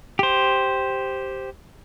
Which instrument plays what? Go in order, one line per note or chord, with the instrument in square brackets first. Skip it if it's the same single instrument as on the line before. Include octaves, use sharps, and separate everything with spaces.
[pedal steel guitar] G4 C5